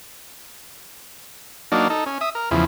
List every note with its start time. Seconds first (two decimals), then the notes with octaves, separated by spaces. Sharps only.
1.72 F#3 A#3 D4 D#4
1.90 D#4 A4
2.06 C#4
2.21 E5 D#6
2.35 A#4
2.51 E2 C#3 F3 E4